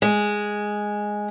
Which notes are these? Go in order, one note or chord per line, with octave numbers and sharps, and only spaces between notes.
G#3